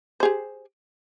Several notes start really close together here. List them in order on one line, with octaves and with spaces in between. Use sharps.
C5 G#4 G4